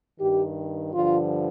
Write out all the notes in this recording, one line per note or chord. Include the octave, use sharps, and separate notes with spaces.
G2 D#3 G4
G2 D3 F3 F4